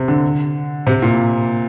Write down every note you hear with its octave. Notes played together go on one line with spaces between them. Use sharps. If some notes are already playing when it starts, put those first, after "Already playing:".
Already playing: C3
D3
C3
A#2